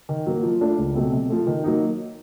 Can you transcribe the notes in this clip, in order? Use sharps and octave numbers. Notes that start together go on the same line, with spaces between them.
D#3
F#3 A#3
F3
A3 D4 F4
C#2
B2 F#3 A3 C4
C3
F3 A3
D#3
F#3 A#3 D#4